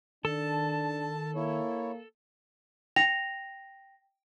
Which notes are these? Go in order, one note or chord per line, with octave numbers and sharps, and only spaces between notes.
D#3 D4 A4 A5
A#3 E4 C#5
G5 A#6 F7